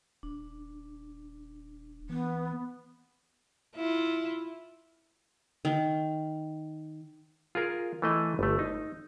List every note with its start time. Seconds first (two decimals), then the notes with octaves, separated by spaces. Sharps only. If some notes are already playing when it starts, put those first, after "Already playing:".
0.23 D#1 D4
2.10 E3 B3
3.76 E4 F4
5.65 D#3
7.55 F4 G#4 A#4
8.02 E3 A3 D#5
8.39 G1 A3
8.59 D#4